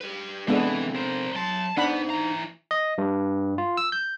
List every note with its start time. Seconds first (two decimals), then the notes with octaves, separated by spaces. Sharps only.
0.01 G4 B4
0.48 C3 E3 G#3 B3 D4 A4
0.95 A#4 C5
1.36 F#3 A5 C6
1.77 B3 D4 D#4 C5 F#5 B5
2.10 E3 A#5
2.71 D#5
2.98 G2
3.58 F4
3.77 E6
3.92 G6